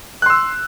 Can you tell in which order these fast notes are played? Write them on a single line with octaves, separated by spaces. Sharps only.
F#6 C6 E6